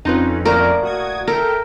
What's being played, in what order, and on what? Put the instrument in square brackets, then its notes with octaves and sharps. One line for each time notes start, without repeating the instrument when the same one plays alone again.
[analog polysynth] F2 C4 C#4 [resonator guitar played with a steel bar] D#4 F4 B4
[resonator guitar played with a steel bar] A2 A#3 D5 [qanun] A#4
[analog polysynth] F#4 D#6 G#6
[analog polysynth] A4 E5 G5 [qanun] A#4